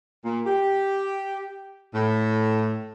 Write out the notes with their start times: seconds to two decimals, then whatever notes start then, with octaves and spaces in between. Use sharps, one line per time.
0.25 A#2
0.46 G4
1.94 A2